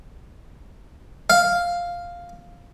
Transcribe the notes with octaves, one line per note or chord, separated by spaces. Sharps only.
F5